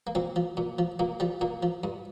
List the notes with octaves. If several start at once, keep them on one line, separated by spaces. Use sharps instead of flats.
A#3
A#2 C4
F3
A#2
F3
A#2 A#3
F3 G3
A#2 A#3
F3
G2